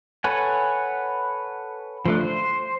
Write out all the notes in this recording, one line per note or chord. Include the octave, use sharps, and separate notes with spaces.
A4 B4 C#5 F#5 G#5
F3 A3 D4
C5